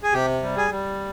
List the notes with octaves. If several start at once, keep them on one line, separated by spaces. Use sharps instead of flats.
G#4
C3 G4
G3
G#4
G3